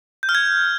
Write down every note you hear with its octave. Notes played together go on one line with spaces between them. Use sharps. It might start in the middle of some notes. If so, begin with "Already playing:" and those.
G6
F6
G#6